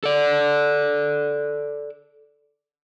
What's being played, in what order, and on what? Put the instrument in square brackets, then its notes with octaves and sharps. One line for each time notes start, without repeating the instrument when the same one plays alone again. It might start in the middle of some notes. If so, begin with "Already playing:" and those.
[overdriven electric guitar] A4 D5